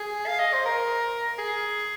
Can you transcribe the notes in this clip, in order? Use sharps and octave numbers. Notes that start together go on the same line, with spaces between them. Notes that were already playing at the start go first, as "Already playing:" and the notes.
Already playing: G#4
F5
D#5
C5
A#4
G#4